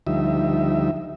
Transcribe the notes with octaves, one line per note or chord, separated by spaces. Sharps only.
D2 F3 G3 D#4 E5